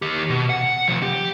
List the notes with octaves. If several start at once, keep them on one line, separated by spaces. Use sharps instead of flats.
D#2 G4
B2
F#5
C3 F3
G4